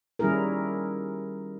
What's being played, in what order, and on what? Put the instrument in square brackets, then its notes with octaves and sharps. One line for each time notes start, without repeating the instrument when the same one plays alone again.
[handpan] D#3 G3 C#4 E4 G#4 A#4